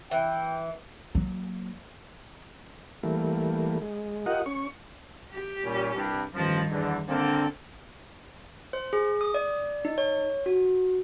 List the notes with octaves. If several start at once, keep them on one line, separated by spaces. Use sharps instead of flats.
E3 G5
F#3 A#3
E3 G3 A3 A#3
G#3
F4 G4 A#4 D#5 F#5
C#4 C#6
G4
A#2 G3 C#4
C2 G2
A1 G2 D#3 F3
E2 D3
D3 A#3 C4 A4
C5
G#4
D#6
D5
D#4
C#5
F#4